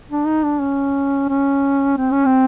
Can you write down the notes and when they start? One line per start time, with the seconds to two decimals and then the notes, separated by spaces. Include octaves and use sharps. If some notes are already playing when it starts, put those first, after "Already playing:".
0.10 D4
0.26 D#4
0.44 D4
0.61 C#4
1.29 C#4
1.97 C4
2.11 C#4
2.26 C4